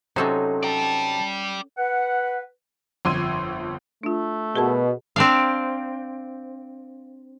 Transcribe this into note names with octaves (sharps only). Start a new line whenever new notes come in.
C3 F#3 C#4 D#4 A4 C5
D5 G5 A5
B4 F#5
G1 F2 C6 E6 G#6 D#7
A3 D4 F4
B2 G#4 A#4 A5
C4 D4 F5